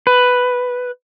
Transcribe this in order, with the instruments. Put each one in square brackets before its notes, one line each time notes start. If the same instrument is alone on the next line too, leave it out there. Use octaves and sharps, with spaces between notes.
[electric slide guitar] B4